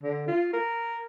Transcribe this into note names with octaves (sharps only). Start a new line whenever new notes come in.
D3
F4
A#4